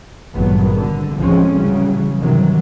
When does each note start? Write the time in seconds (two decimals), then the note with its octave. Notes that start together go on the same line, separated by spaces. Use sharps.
0.34 G#1 G2 A#2 F#3 B3
0.77 D3
1.16 A1 D2 F3 G#3 C4 C#4
1.55 C#3 E3 F#3 G3
2.18 G2 C3 D#3 E3 F#3